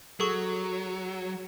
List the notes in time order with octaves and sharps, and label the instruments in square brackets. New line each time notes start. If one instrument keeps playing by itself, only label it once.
[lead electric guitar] F#3 [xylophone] G#4 A4 C#6